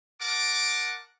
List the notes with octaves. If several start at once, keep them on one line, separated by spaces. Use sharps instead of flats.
A#4 F#5 A5 D6